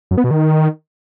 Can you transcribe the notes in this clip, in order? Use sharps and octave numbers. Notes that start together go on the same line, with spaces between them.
F#2
B3
B2
D#3